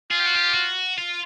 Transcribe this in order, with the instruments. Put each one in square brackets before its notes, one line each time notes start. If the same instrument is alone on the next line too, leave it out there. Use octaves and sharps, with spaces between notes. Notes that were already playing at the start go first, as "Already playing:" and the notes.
[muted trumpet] F4 [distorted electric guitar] G#4
[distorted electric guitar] G4
F#4
G4
F#4
F4